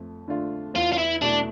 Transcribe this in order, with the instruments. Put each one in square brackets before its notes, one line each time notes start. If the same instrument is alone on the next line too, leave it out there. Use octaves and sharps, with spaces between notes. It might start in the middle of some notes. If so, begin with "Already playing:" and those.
Already playing: [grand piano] F2 A3
D3 A3 D4 F4
[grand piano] E2 [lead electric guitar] F4
[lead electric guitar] F4
E4
[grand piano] B2 A3 E4 [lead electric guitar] D4